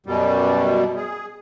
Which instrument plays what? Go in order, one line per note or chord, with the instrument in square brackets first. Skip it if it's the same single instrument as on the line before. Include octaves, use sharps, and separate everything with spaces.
[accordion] F#2 B2 G3
G#4